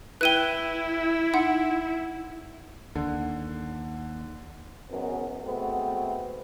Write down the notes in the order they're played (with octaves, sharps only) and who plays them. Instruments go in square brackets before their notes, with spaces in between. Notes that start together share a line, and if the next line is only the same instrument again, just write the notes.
[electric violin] E4 [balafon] B4 G5 [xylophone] F#6 D#7 G7
[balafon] D#4 [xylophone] F#5
[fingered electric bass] D#2 [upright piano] D3
[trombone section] G#1 F#2 B2 B3 A#4
G#3 A3 B3 C4 F#4